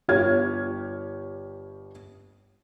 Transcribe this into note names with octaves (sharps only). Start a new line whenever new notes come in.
G1 G4 C#5 F6 G#6